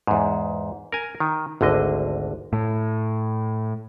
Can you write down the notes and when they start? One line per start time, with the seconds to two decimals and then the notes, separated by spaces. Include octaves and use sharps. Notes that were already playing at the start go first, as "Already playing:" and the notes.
0.07 E2 G#2
0.92 A#4 G#5
1.20 D#3
1.61 G#1 D2 D3 D#5
2.53 A2